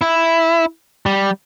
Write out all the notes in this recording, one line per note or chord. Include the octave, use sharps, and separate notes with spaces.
E4
G3